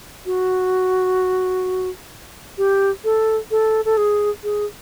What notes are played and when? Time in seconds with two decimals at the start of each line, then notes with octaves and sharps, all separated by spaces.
0.26 F#4
2.58 G4
3.04 A4
3.51 A4
3.85 A4
3.97 G#4
4.44 G#4